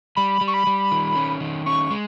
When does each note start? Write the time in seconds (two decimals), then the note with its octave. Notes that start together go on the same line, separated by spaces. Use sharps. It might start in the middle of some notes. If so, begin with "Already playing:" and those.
0.16 G3 B5
0.41 G3
0.48 C#6
0.54 B5
0.67 G3
0.91 D#3
1.16 C#4
1.40 D#3
1.66 C#4 C#6
1.91 G#3